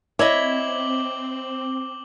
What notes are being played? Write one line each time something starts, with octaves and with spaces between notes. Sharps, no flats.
C4 E4 C#5 D#5 D6 F#7 G7